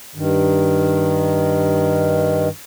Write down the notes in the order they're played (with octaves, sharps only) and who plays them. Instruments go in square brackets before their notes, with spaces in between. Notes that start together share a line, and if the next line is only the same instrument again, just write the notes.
[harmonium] G2 D#3